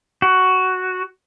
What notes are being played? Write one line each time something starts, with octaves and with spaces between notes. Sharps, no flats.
F#4